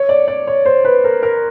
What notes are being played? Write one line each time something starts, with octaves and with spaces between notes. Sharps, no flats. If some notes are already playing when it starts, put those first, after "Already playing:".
Already playing: C#5
D5
D5
C#5
C5
B4
A#4
A#4